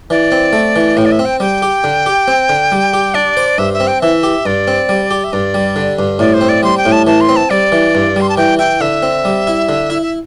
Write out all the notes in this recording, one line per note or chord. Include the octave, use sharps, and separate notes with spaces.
E3 D5
C4
A3
E3
A2 G5
D5
E5
C4
G5
G3 G5
G4
D3
G4
C4
D3
G3
G4
D4 D5
C5
G2 E5
E5
C4
G5
E3 E5
G4
G2 D5
C4
G3
G4
E5
G2 D5
G3
D3
G2
A2 D5
C5
C4
D5
G3 C6
G5
A2
A5
E3 A5
C6
C4
A5
G3 D5
E3
G2
G3 C6
A5
E3 G5
E4 G5
D3 E5
C4
G3
E4
D3
E4
E5